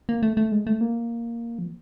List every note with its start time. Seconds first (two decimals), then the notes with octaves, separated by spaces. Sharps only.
0.09 A#3
0.23 A3
0.37 A3
0.52 G#3
0.67 A3
0.81 A#3
1.59 F3